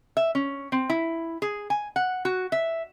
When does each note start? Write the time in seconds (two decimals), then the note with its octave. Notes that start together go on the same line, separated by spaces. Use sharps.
0.17 E5
0.35 C#4
0.72 C4
0.90 E4
1.42 G#4
1.70 G#5
1.96 F#5
2.25 F#4
2.52 E5